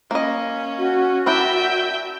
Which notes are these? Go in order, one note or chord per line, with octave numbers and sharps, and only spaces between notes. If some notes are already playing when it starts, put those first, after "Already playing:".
A#3 C#4 D#5
F#4
D4 E4 A#4 E5 G5